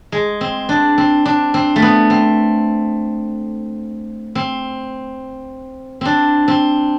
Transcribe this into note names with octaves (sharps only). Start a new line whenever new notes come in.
G#3
C4
D4
C4
D4
C4
A3
B3
C4
C4
C4 D4
C4